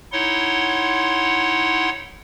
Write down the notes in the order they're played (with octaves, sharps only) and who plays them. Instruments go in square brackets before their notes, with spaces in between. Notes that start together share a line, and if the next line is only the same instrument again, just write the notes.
[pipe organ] D#4 E4 C#5 F#5 C6